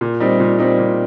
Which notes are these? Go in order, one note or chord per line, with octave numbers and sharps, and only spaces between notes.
A#2
G3 C4 D#4
A#2
G3 C4 D#4
A#2